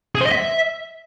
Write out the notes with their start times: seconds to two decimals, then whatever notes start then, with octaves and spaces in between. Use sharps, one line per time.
0.15 G#4
0.21 C5
0.26 D#5
0.32 E5